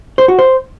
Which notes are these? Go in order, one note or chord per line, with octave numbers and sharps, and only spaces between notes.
C5
F#4
C5